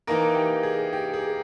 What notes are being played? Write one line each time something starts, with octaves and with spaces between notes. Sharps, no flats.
E3 A#3 D#4 A#4
G4
G#4
G4
G#4